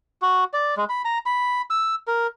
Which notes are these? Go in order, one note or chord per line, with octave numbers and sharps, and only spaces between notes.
F#4
D5
G#3
B5
A#5
B5
E6
A#4